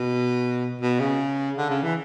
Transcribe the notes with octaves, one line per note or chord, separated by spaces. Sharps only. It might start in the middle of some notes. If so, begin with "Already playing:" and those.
Already playing: B2
B2
C#3
D3
C#3
E3